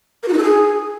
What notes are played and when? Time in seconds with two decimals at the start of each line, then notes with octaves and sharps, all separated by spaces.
0.23 A#4
0.28 F#4
0.33 D#4
0.38 A4
0.43 G#4